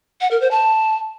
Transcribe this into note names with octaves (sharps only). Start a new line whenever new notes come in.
F#5
A#4
C5
A5